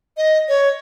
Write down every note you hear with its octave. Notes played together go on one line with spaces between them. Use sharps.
D#5
C#5